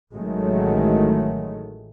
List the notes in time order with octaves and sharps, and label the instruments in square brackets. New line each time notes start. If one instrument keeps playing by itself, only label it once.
[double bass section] A1 A2 D#3 F#3 G#3 A3